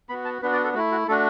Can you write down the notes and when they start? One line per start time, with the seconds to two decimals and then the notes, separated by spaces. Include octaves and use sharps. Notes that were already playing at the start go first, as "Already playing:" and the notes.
0.09 B3 F#4 B5
0.25 A5
0.42 B3 D4 F#4 B4
0.53 D5
0.64 A4
0.74 A3 E4 F#4
0.92 F#4
1.08 A3 D4 F#4 A4